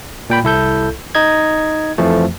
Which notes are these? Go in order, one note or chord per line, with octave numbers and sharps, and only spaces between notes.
A#2 G5 B5
C2 E4 A4 G6
D#4 D#5 G#6
F2 E3 F3 A3